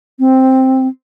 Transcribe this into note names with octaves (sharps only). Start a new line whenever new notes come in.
C4